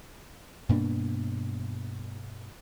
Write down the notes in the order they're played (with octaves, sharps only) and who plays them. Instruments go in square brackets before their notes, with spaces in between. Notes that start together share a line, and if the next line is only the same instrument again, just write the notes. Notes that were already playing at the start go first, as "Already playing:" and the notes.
[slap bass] G2 B2 A#3 D4